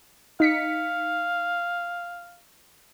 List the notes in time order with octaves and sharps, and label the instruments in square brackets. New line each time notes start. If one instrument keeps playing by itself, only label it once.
[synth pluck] D#4 B6 C#7 [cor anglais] F5